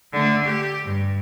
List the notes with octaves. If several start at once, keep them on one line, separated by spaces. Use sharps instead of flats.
D3 A3
G4
G2